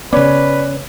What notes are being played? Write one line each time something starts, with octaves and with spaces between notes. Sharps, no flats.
C#3 B3 C#4 B4 D5